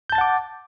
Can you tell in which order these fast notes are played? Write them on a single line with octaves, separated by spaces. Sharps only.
G6 A5 A6 F#5 D6